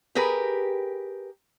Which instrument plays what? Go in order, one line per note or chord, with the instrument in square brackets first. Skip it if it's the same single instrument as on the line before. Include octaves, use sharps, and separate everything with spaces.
[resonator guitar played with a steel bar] G4 G#4 A#4 B4